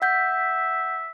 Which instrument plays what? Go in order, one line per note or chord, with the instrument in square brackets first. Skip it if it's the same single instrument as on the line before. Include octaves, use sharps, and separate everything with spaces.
[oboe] E5 [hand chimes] F#5 G6 B6